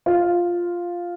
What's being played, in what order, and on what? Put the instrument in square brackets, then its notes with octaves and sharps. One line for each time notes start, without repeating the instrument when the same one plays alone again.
[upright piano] F4